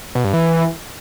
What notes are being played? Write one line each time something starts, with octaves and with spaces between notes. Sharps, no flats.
B2
G2
E3